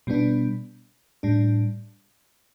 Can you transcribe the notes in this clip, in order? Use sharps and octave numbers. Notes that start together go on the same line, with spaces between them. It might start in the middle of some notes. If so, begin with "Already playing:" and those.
B2 G3 B3 D4
A2 G3 D4